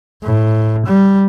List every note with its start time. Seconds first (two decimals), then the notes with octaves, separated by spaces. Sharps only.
0.23 A2
0.86 G3